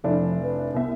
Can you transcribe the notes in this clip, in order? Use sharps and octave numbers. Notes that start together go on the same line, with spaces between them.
F1 F3 D4 E4
B4
C2 B3 E5